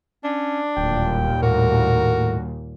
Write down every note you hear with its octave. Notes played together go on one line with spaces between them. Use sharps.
C#4 D4
D1 D#2 A#2 G3 G5
A2 F#4 A#4